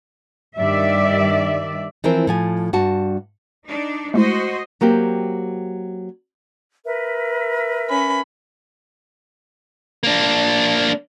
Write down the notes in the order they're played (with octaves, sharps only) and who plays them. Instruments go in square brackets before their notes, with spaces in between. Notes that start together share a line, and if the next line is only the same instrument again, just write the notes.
[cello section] G2 D#3 D5 E5
[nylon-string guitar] E3 F3 C4 E4 A#4 C5
A2 F3 G#5
G2 F#4 A5
[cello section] D4 D#4
[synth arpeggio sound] G#3 A3 E4 [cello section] F#4 C5 D#5
[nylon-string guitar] F#3 A#3 C4 G4
[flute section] A#4 B4 E5
[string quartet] C#4 B5
[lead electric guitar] A#3 D4